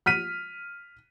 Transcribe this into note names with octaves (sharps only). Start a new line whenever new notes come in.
F6 B6 D#7